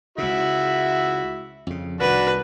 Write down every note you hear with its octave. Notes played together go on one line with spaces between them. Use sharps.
C#2 C#3 E4 F#4 E5
F2 C#3
C2 D#3 D4 F#4 B4